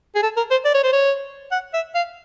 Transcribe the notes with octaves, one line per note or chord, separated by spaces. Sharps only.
G#4
A4
A#4
C5
D5
C#5
C5
C#5
F#5
E5
F5